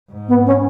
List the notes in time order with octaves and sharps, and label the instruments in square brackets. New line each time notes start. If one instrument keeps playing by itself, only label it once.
[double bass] G#2
[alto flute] B3
C#4